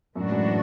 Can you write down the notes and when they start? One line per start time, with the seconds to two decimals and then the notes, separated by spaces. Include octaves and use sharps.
0.15 F#2 A2 E3 G#3 D4 F#4
0.31 F#2